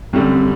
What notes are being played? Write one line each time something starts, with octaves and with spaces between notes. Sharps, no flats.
F#2 D3 G3 C4